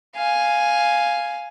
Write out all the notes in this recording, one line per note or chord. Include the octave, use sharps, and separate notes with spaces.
F5 G#5